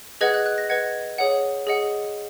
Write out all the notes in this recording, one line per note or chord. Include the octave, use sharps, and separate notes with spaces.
G#4 B4 D#5 F#5 G#6
F#6
F#6
A#6
B4 D#5 F#5 G#6
G#4 C#5 F#5
G#4 D#5 F#5